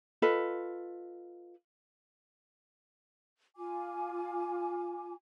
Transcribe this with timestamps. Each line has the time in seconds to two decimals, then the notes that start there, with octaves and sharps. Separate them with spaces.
0.22 F4 A4 B4 D#5
3.56 F4 G#5 D6